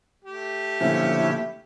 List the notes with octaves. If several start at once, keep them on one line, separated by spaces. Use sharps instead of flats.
A3 G4
B1 A#2 D3 F3 C#4 E4 E5